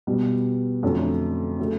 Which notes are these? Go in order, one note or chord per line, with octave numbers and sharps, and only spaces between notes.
B2 G3 B3
F2 D3 F#3 A3 C#4
C#3 F#3 A3